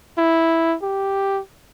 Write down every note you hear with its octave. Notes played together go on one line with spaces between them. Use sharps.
E4
G4